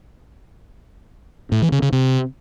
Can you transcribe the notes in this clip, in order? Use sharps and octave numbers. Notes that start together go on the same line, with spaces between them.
A2
E3
C#3
C#3
C3